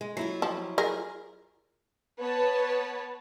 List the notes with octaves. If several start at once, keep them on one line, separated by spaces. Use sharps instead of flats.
G#3
F#3 E4 F4
F3
G#4 A#4
B3 B4 C#5 A5